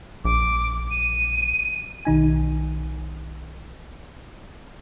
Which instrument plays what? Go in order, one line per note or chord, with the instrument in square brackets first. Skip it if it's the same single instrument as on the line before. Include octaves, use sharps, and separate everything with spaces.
[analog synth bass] A#1 [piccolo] D6
[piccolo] D#7
[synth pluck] B1 D#3 D#4 G#5